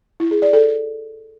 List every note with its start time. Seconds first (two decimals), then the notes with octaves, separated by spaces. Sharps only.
0.20 E4
0.31 G#4
0.42 D5
0.53 A4